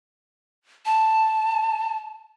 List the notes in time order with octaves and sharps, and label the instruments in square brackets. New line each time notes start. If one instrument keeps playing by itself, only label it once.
[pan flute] A5